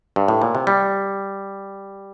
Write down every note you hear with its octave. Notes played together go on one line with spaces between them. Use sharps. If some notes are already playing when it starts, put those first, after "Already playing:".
G2
A2
A#2
C3
G3